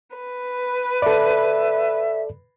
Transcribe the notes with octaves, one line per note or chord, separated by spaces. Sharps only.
B4
A4 D5 E5